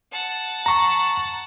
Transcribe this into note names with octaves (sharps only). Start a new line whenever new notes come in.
F#5 A5
A#5 C#6